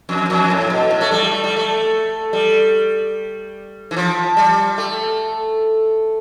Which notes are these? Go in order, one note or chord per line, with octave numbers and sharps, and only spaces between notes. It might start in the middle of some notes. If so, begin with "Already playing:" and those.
F2
F2
A2
B2
A2
A3
G3
A3
G3
A3
G3
E3
F3
G3
A3